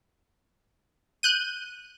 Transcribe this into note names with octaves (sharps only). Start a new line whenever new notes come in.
F#6 G6 D#7